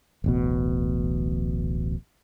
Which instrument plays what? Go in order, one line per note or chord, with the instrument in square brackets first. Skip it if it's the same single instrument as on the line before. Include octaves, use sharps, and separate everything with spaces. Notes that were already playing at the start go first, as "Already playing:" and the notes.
[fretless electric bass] D1 A1 B2